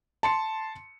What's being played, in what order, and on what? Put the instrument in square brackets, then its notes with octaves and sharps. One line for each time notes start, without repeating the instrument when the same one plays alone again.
[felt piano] A5 C6 C#7